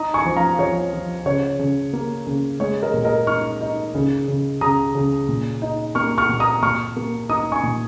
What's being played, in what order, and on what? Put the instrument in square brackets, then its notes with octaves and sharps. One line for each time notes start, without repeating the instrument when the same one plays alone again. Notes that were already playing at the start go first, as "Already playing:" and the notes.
Already playing: [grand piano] D#4 A#5 D#6
G#5 C#6
F3
F5 A#5
F3 C#5
F3
C#3 C#5
C#3
A#3
C#3
G#3 C#5
A#4 D#5
A#2
A#4 D#5
D#4 C#6 F6
D#4
C#3
C#3
C#3 A#5 D#6
C#3
A#2
D#4
A#3 C#6 F6
C#6 F6
A#2
A#5 D#6
A#2 C#6 F6
A#3
D#4 A#5 D#6
G#5 C#6
A#2